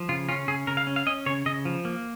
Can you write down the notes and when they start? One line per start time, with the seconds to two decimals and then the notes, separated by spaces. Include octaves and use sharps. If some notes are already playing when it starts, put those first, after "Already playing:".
Already playing: F3
0.09 C#3 F4
0.29 C#4 F4
0.48 C#3 G#4
0.67 C#3 A#4
0.77 F5
0.87 C#4
0.96 F5
1.06 C#4 D#5
1.26 C#3 C#5
1.46 C#3 D#5
1.65 F3
1.85 A#3